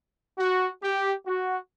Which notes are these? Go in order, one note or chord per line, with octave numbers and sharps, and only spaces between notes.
F#4
G4
F#4